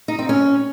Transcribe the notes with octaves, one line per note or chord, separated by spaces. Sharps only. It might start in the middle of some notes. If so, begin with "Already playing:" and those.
D#4
C4
C#4